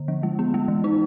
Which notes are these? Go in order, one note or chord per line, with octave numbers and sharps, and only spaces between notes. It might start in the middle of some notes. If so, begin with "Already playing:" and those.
Already playing: D3
F3
G#3
B3
G#3
E3
D#4